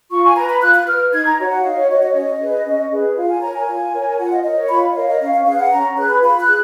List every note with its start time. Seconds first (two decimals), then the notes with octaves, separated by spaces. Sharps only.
0.10 F4 C#6
0.23 G#5
0.36 B4 A#5
0.49 B5
0.62 F4 F#6
0.74 F#6
0.86 B4 F6
1.12 D#4 G#6
1.25 A#5
1.38 F#4 C#5
1.51 F#5
1.63 D#4 F5
1.76 C#5
1.89 F#4 C#5 D#5
2.01 D#5
2.09 C#5
2.14 C#4 D#5
2.40 G#4 B4
2.65 C#4
2.91 G#4 B4
3.17 F4 F5
3.29 G#5
3.41 A#4 C#5 A#5
3.55 G#5
3.67 F4
3.93 A#4 C#5
4.18 F4 F#5
4.32 D#5
4.43 A#4 C#5 D#5
4.56 C#5
4.69 F4 B5
4.91 D#5
4.95 A#4 C#5 F5
5.08 D#5
5.20 C#4 F5
5.33 F5
5.46 G#4 B4 F5
5.59 F#5
5.71 C#4 A#5
5.97 G#4 B4 F#6
6.09 B5
6.22 F4 B5
6.40 F#6
6.48 G#4